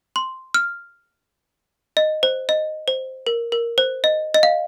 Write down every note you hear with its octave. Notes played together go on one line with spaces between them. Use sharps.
C6
F6
D#5
C5
D#5
C5
A#4
A#4
C5
D#5
D#5
F5